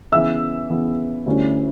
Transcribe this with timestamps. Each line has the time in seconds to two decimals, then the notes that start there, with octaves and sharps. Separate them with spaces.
0.12 C#3 E3 B3 E5 E6
0.70 C#3 E3 B3
1.26 D2 D3 G3 C#4 E4